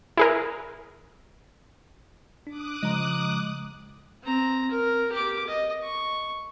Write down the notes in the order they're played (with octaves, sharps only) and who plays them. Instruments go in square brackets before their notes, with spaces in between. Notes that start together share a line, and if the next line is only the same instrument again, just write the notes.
[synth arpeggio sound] E4 G#4 A#4
[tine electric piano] D4 [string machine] D6 D#6 F#6
[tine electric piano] C#3 F3 A#5 [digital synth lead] G#3
[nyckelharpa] C4 A#5
A#4
G4 D6
D#5
C#6